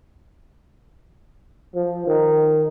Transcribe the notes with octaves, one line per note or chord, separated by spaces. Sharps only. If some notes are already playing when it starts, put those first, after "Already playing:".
F3
D#3